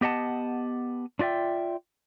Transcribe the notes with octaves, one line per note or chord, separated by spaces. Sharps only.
B3 G4 D#5 F#5 A5
D4 F4 D5 E5 G5